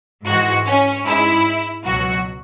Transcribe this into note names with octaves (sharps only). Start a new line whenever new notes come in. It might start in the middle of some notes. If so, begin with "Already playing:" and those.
G#2 E3 G#3 F#4
C#4
G#2 G#3 E4
C#2 B2 F#3 F#4